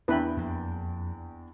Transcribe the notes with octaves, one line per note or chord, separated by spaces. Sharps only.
E2 D4 E4 B4 G5
F2 A#3